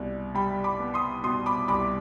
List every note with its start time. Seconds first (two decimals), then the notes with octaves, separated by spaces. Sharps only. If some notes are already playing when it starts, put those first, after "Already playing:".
Already playing: C2 B2
0.35 G3 G5 B5
0.64 B5 D6
0.79 B3
0.94 C6 D#6
1.23 B2 C6 D#6
1.46 B5 D6
1.68 C2 B5 D6